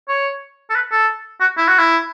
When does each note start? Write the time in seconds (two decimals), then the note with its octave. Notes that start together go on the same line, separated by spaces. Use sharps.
0.09 C#5
0.70 A4
0.75 B4
0.92 A4
1.41 F#4
1.58 E4
1.68 F#4
1.79 E4